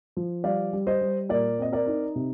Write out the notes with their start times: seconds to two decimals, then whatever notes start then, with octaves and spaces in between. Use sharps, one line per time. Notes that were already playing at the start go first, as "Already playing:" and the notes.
0.17 F3
0.44 G3 D5 F5
0.73 G3
0.87 C5 D#5
1.01 G3
1.29 A#2 A#4 D5
1.59 C4 D#5
1.72 A#4 D5
1.86 D#4
2.15 C3